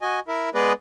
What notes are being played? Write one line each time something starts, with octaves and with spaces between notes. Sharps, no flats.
F#4 D#5 G#5
E4 A#4 E5
G#3 B3 G#4 B4 D5 D#5